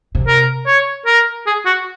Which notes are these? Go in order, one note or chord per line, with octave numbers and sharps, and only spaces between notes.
C3
A#4
C#5
A#4
G#4
F#4